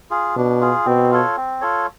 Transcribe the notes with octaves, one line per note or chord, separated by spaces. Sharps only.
F4 G#4
B2 D4
F4 G#4
B2 C4
F4 A4 C#5
C4
F4 A4 C#5